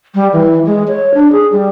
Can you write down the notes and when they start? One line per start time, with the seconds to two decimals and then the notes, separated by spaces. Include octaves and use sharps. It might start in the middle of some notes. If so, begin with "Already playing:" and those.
0.15 G3
0.33 E3
0.66 G#3
0.88 C#5
1.14 D4
1.32 G#4
1.52 G3